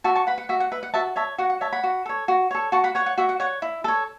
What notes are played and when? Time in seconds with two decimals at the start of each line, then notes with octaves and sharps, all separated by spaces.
0.04 F#4 E5 A5
0.15 A5 C#6
0.27 B4 F#5 B5
0.38 F#5
0.49 F#4 E5
0.60 F#5
0.72 B4 E5
0.83 F#5
0.94 F#4 E5 A5
1.16 C#5 E5 A5
1.38 F#4 F#5
1.50 F#5
1.61 C#5 E5 A5
1.72 F#5 B5
1.84 F#4
2.06 A4 C#5
2.28 F#4
2.51 A4 C#5
2.72 F#4 A5 C#6
2.84 F#5 B5
2.95 C#5 F#5
3.06 F#5
3.18 F#4 E5
3.29 F#5
3.40 C#5 F#5
3.62 E4
3.84 A4 C#5